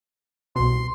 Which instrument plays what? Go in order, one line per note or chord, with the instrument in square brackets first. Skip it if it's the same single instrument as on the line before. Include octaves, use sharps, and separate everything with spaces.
[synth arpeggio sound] C2 B2 [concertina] C6